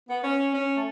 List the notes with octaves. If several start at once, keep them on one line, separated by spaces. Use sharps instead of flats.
B3
C#4
C#4
A3